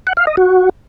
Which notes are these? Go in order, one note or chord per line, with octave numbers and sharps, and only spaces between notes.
F#5
F5
D#5
F#4